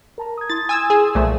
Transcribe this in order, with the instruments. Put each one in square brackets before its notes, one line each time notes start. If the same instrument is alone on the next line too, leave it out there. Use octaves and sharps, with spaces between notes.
[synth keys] A#4 A5 A#5
D#6 G#6
[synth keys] E4 C6 D#6 [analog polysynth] A6
[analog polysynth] G#5 E6
G#4
[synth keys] B1 [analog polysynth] A#2 F3 A3